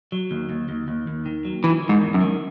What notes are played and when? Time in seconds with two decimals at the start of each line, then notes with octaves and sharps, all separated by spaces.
0.12 F#3
0.31 D#2
0.50 D#2
0.69 D#2
0.88 D#2
1.07 D#2
1.26 D#3
1.45 F#3
1.64 D#3 E3
1.83 D#3
1.89 G#2
2.02 E2
2.14 F#2
2.21 D#3